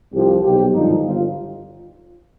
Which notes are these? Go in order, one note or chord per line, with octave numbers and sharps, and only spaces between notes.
C2 C3 F3 G4
B1 B2 G4
G#1 G2 D3 F3 D#4
G1 F4